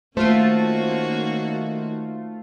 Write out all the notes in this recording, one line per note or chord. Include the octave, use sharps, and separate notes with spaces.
D#3 A3 A#3 C#4 F4 F#4 C5